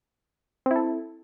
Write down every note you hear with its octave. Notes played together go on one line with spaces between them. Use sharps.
C4 E4 A4